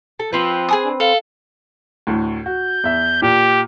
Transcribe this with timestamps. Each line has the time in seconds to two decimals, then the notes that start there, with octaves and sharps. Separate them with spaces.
0.19 A4
0.33 F3 C4 B4
0.69 G#4 G#5 D#6
0.84 D4
1.00 A4 F5
2.07 D2 A2
2.46 F#4 G6
2.84 E2 E5
3.22 A#2 G4